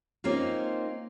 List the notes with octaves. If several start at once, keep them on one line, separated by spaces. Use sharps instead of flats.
A#3 C4 C#4 D#4 F4